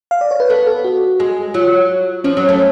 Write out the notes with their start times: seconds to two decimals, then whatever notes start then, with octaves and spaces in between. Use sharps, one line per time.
0.11 F5
0.21 D5
0.31 C#5
0.40 B4
0.50 B3 A4
0.67 A4
0.84 F#4
1.20 G#3
1.54 F#3 F4
2.24 F3 C#4
2.37 F#3
2.49 A3